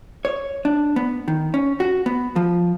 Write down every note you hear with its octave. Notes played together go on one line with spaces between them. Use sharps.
C#5
D4
B3
D#3
C#4
F#4
B3
F3